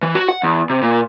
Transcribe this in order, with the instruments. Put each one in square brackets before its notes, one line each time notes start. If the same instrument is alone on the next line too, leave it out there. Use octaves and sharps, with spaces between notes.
[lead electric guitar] E3
F#4
F#5
E2
C3
A#2